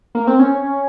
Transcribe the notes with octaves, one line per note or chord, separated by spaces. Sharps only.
A#3
C4
C#4